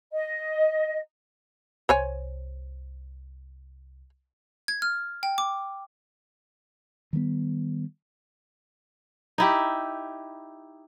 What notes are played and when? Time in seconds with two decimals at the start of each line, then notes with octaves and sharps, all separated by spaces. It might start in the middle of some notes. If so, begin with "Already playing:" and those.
0.12 D#5
1.89 C2 C5 C#5 G#5
4.68 G#6
4.82 F6
5.23 G5
5.38 D6
7.13 D#3 G3 A#3 B3
9.38 D#4 E4 G4